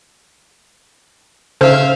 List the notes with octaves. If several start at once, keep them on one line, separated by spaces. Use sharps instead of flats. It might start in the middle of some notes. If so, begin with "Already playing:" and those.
C#3 A4 C5 E5 F5 F6